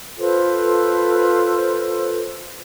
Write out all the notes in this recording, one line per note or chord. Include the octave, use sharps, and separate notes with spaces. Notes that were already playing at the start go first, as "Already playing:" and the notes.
F4 A4 B4 C5